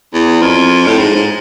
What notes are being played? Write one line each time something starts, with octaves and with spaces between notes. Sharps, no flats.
E2
F2
A2
G#2
G#2